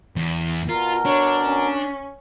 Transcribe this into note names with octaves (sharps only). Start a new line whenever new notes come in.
E2
B2 F4 A#4
D4 C#5
C#4